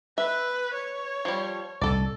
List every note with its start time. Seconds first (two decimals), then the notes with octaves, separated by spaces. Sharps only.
0.18 B4 E5
0.74 C#5
1.25 F3 G3
1.81 C2 A2 A4 D5